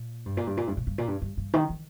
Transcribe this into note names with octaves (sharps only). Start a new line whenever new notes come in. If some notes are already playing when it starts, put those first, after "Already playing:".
Already playing: A#2
G2
A#2
G2
A#2
G2
A#2
G2
A#2
G2
G2
G2
D#3
D#3